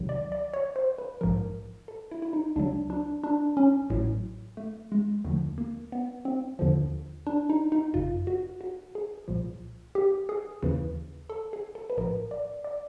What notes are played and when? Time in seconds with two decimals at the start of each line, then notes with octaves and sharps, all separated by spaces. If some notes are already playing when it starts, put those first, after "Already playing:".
Already playing: C#2 C3 D#3 F#3
0.09 D5
0.32 D5
0.54 C#5
0.76 C5
0.98 B4
1.21 A#1 G#2 F3 A#4
1.88 A4
2.11 E4
2.22 E4
2.33 D#4
2.56 C#2 C#3 F#3 D4
2.90 D4
3.24 D4
3.57 C#4
3.90 A1 A2 F#3
4.57 A3
4.92 G#3
5.25 D#2 D3 F3 A3
5.58 A#3
5.92 B3
6.25 C4
6.59 D#2 D3 F3
7.27 D4
7.50 D#4
7.72 D#4
7.93 G#1 F#2 C#3 F4
8.27 F#4
8.61 F#4
8.95 G#4
9.28 C2 A#2 F3
9.95 G4
10.29 G#4
10.63 D#2 C#3 E3
11.30 A4
11.53 G#4
11.75 A4
11.90 B4
11.97 A#1 A2 F3 A#4
12.31 D5
12.64 D5